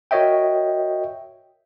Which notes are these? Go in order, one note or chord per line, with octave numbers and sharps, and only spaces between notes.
F#4 A#4 C#5 D#5 E5 G5